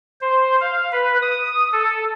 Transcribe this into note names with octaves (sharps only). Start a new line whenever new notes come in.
C5
F5
B4
D#6
A4